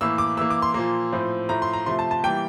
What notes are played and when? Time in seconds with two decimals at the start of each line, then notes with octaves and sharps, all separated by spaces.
0.01 A2 E3 A#3 E6
0.18 D6
0.37 E3 A#3 E6
0.50 D6
0.62 C6
0.74 A#2 F3 A#3
1.13 A2 F3 C4
1.49 A2 F3 A3 A#5
1.62 C6
1.73 A#5
1.86 C3 F3 A3 C6
1.99 A5
2.11 A5
2.23 E3 G3 A#3 G5